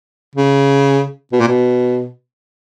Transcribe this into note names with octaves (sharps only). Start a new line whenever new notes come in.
C#3
B2
A#2
B2